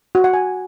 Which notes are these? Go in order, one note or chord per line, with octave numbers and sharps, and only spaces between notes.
F#4
F#5
G#5